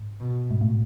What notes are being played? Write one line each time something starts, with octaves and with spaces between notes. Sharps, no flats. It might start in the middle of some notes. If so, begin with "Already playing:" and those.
Already playing: G#2
B2
G#2
A2